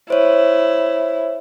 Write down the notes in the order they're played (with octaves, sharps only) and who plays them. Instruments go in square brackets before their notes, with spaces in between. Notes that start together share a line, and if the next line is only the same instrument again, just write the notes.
[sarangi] E4 [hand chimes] C5 C#5